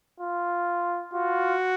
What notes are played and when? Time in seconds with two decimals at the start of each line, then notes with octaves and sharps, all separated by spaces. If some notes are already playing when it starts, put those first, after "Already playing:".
0.20 F4
1.13 F4 F#4